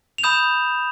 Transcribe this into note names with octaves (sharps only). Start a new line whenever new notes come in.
F7
B5 D#6 G6 E7